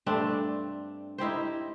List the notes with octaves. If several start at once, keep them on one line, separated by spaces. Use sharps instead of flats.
G2 A3 C4 D4
D#4 E4 G4 C5